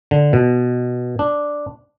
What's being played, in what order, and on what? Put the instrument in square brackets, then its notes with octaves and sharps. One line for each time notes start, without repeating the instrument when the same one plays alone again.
[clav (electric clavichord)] D3
B2
D4